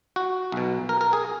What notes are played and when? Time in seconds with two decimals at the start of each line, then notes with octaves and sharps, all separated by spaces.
0.16 F#4
0.52 B1 B2
0.89 A#4
1.01 A#4
1.13 G#4